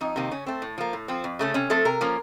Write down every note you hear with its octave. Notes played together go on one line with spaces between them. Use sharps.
F2 D#4
C3 D#3 A#3
C#3 C#4
A3 C4
A2
F3 A#3
A2
F3 C4
F2
C#3 A3 C#4
C3 C#4
F3 A3 C4 A4
C3 A#4
F3 A#3 C#4